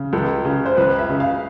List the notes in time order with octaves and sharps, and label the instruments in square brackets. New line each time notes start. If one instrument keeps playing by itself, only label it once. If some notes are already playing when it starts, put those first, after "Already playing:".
Already playing: [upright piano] C#3
C#2 A4
C#3
C5
C#2 B4
E5
C#3
F5